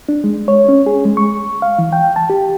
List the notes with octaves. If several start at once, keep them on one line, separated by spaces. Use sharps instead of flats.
D4
G#3
C#5
C#4
G#4
G#3
C#6
F5
E3
G5
A5
G4